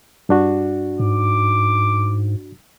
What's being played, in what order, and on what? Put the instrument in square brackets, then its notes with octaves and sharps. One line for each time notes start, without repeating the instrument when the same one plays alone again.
[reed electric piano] G2 D4 F#4
[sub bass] G#2 [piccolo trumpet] D6